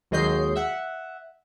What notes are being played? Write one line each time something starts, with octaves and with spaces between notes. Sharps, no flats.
D#2 F#3 G#3 D#5 G6 C7
E5 F#5